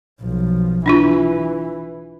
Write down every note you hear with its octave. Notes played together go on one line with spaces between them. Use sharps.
B1 F3
E3 D4 E4 F4